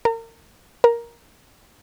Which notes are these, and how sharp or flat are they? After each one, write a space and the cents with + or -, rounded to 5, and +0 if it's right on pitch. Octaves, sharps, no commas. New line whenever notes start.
A#4 -35
A#4 +10